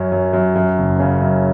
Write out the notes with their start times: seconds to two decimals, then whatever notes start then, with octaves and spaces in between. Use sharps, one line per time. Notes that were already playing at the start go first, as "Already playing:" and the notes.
Already playing: F#2 C#4
0.12 F#2
0.33 F#2
0.55 F#2
0.78 F#1
0.99 C#3
1.22 F#2